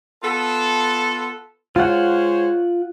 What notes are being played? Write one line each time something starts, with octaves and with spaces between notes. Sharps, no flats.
B3 F4 A4
G#3 F4 C5 C#5 F#5